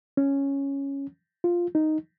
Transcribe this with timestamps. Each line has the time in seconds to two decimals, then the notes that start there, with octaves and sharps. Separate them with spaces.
0.17 C#4
1.44 F4
1.75 D#4